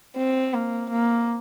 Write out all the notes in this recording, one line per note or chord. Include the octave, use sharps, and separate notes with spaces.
C4
A#3
A#3